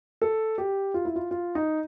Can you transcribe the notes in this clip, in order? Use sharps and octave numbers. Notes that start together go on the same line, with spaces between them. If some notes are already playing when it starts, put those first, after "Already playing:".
A4
G4
F4
E4
F4
F4
D#4